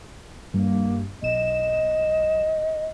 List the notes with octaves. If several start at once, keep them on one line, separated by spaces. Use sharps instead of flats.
G2 A#3
B1 D#5 E7